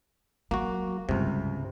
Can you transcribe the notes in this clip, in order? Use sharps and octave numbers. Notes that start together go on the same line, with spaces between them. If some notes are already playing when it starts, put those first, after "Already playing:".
F#3 A#3 F#4
C#2 G2 C3